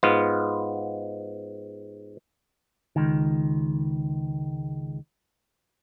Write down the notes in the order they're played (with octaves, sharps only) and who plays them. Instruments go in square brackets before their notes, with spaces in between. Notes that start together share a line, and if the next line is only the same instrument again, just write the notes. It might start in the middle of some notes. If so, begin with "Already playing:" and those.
[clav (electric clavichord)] G#2 B3 F4
[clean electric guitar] C#2 D#3